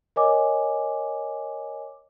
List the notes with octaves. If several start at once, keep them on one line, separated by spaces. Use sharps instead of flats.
A#4 C#5 D#5 G#5 D6